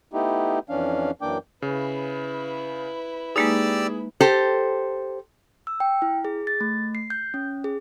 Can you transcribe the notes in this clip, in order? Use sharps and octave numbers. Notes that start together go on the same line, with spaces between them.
A3 B3 D#4 E4 G4
F2 E3 C#4 D4 F5
F#2 E3 A#3 D4 G5 D6
C#3 E4 B4
G#3 A#3 D#4 G4 G#4 D5 E6
G4 A4 C5
E6
G5
E4
G#4
A6
A3
C7
G6
C#4
G#4